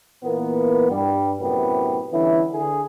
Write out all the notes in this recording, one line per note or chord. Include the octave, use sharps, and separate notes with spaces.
A#2 E3 A#3 B3
G2 G3
F#2 A2 C3 B3 G4 B4
D3 E3 G3 B3 C#4 E4
D3 G#4